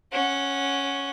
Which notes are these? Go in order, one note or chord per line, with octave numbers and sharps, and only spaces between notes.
C#4 F#5